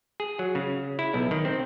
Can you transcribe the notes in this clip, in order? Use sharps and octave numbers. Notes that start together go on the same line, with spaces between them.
G#4
F#3
C#3
E4
B1
D#3
C4